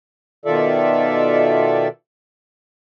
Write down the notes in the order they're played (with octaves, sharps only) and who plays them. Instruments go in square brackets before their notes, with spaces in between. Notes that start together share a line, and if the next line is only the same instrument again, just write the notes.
[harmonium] B2 D#3 F4 A4 D5 E5